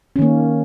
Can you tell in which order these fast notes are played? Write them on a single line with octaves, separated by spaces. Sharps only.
C#4 D#3 A#3